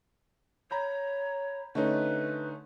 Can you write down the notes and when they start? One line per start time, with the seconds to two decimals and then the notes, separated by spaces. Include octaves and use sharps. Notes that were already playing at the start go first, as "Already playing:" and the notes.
0.71 C#5 A#5 B5 G6
1.75 D3 A3 C#4 D#4 B4